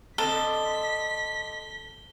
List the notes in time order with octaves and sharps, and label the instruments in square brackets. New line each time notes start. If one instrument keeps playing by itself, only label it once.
[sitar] D3 C4 D#5 [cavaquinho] A4 [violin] B6 [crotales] G7